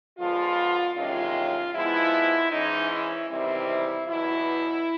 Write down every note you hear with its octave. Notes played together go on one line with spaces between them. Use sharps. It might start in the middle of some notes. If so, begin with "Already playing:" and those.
D3 F3 G#3 B3 F4
E2 C3 D#3 G#3 C#4 F4
G#2 F3 G#3 B3 E4
G#2 E3 G#3 C#4 D#4
E4
E2 C3 D#3 G3 C4 E4
E2 B2 F#3 E4